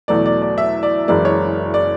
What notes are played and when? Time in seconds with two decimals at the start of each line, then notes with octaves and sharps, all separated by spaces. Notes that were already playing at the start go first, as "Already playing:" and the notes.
0.08 E2 B2 F#3 A3 D5
0.26 D5
0.42 D5
0.58 E5
0.83 D5
1.08 F#1 F#2 E3 G#3 D5
1.25 C#5
1.74 D5